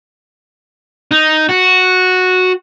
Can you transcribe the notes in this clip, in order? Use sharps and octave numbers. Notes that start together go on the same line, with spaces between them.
D#4
F#4